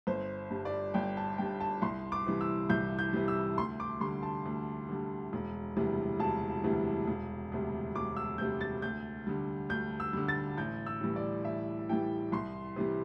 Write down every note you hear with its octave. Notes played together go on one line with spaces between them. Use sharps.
G1 C5
G2 G3
D5
G1 G5
A5
G2 G3 G5
A5
C2 C6
D6
C3 E3 G3
E6
C2 G6
G6
C3 E3 G3
E6
D2 C6
D6
D3 G3 C6
A5
D2
D3 G3
E1
D2 C3 E3 G3
E1 A5
D2 C3 E3 G3
E1
D2 C3 G3
E1 D6
E6
D2 C3 G3 G6
A6
D2 G6
D3 G3
D2 G6
E6
D3 G3
A6
A1 G6
E6
A2 E3 G3
D5
A1 E5
A2 E3 G3 G5
C2 C6
C3 E3 G3